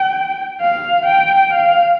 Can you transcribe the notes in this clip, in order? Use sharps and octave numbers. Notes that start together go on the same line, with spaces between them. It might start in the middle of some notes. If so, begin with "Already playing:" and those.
Already playing: G5
F5
G5
F5